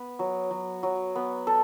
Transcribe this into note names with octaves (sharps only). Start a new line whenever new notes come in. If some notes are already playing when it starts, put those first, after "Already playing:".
Already playing: B3 B4
F#3
F#3
F#3
B3
A4